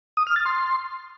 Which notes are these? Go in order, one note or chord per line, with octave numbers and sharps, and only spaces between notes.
D#6
F6
A6
C6